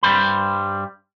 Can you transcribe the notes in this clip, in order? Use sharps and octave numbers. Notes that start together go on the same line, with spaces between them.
G2 G3 C5 B5